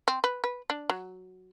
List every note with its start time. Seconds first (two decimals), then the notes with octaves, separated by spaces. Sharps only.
0.08 C4
0.24 B4
0.44 B4
0.70 D4
0.90 F#3